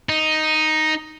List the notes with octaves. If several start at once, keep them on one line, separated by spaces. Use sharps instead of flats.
D#4